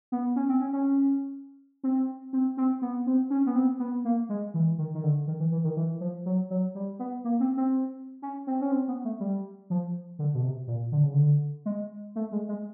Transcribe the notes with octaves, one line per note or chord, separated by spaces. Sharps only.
B3
C#4
C4
C#4
C#4
C4
C4
C4
B3
C4
C#4
B3
C4
B3
A#3
G#3
E3
D#3
D#3
D3
D#3
E3
E3
D#3
E3
F3
F#3
F#3
G3
B3
A#3
C4
C4
C#4
C4
C#4
C4
B3
A3
G3
F3
D3
B2
C3
A#2
D3
C#3
D3
G#3
A3
G#3
G#3